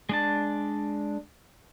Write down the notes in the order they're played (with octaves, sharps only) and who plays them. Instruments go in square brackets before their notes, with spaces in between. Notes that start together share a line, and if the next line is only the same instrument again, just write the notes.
[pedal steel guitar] G#3 D4 A5